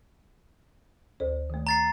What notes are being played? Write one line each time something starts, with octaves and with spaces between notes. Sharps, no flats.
D2 A4 C5
D#3 A3
A#5 A6 C7